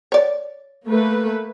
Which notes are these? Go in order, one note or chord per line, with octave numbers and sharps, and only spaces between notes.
C#5 D5
A3 A#3 B4